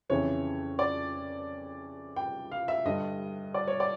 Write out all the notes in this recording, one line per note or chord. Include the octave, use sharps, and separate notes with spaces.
F2 C#3 E3 C#5
D5
G5
F5
E5
G2 D3 G3 D#5
D5
C#5
D5